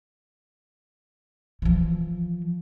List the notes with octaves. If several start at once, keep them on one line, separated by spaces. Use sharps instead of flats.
E3 F3